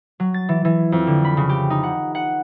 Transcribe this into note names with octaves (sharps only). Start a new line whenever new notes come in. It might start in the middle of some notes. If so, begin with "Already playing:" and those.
F#3
A6
E3
E3
F2
D3
B5
C#3
G4
D#4
F#5
F#5